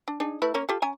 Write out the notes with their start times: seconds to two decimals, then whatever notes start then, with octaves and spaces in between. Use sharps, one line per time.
0.08 D4
0.20 D4 D#4 G#4
0.42 A3 E4 B4
0.54 A#3 C#4 A#4
0.69 F4 G4 A4
0.82 C#4 G#5 A#5